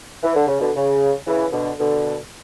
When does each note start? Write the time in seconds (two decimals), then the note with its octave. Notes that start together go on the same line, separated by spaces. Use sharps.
0.23 E3
0.35 D3
0.47 C#3
0.60 B2 D3
0.75 C#3
1.27 C#3 E3
1.52 B2 D3
1.79 B2 D3